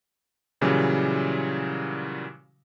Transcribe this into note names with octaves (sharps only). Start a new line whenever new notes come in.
A#2 C#3 E3 F#3 G3